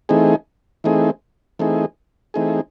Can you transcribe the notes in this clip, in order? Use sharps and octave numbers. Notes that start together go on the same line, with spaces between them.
E3 A3 C4 D#4 G#4
E3 A3 C4 D#4 G#4
E3 A3 C4 D#4 G#4
E3 A3 C4 D#4 G#4